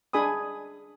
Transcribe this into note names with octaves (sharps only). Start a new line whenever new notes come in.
D4 G#4 G#5 B5 D#6